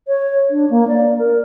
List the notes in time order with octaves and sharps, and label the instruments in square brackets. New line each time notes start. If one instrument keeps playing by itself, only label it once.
[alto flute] C#5
D4
A#3
D5
A#4